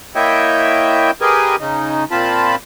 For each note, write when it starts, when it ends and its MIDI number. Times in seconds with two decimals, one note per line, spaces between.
0.16 1.11 58
0.16 1.11 64
0.16 1.11 73
0.16 1.11 75
0.16 1.11 76
0.16 1.11 79
1.21 1.56 67
1.21 1.56 68
1.21 1.56 70
1.21 1.56 71
1.21 1.56 75
1.21 1.56 80
1.60 2.04 49
1.60 2.04 63
2.11 2.55 46
2.11 2.55 60
2.11 2.55 65
2.11 2.55 81
2.11 2.55 83